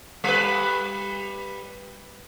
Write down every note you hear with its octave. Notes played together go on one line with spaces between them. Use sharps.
G3 B4